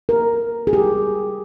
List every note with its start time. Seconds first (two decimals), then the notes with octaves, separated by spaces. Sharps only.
0.09 A#4
0.67 G#4
0.73 G4